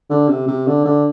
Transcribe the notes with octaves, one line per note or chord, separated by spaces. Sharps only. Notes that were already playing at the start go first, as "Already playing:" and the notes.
D3
C3
C3
D3
D3